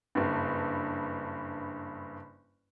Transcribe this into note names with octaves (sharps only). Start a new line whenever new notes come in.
F#1 G2